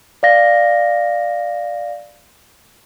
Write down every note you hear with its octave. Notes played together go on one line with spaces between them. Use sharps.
D5 F5 A#6